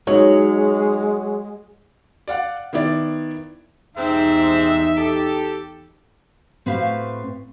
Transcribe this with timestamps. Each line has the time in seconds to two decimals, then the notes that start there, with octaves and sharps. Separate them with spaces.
0.07 F#3 G#3 D#4 C#5
2.28 D5 F5 F#5
2.73 D#3 B3 E4 D5
3.97 E2 G#2 C3 C4 D#4 E5
4.97 G4 A4
6.66 A2 C4 F#4 B4 E5 F5